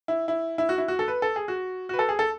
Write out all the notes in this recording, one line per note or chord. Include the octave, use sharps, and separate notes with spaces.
E4
E4
E4
F#4
E4
F#4
A4
B4
A4
G#4
F#4
F#4
B4
A4
G#4
A4